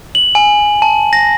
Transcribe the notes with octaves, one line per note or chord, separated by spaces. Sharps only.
F#7
G#5
A5
A#6